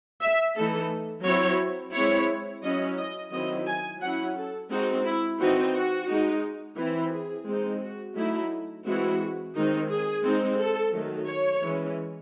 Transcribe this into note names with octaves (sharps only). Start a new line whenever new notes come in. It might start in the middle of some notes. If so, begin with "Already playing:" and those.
E5
E3 A3 D#4 A4
F#3 C4 E4 C#5
G#3 C4 E4 C#5
F#3 C#4 E4 D#5
D#5
D#3 F#3 C4 E4 D#5
G#5
F#3 C#4 E4 F#5
A4
G#3 C4 D#4 F#4
E4
E3 C4 D#4 F#4
F#4
G#3 D#4
E3 C4 E4
G#4
G#3 C4 D#4
F#4
F#3 A3 D#4 E4
E3 G#3 C4 E4 F#4
D#3 G#3 C4 D#4
G#4
G#3 C4 D#4
A4
D#3 F#3 A3
C#5
E3 G#3 C#4